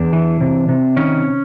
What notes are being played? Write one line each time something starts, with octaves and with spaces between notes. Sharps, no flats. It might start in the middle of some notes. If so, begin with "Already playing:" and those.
Already playing: E2 D4
E3
C3
C3
D#3 C#4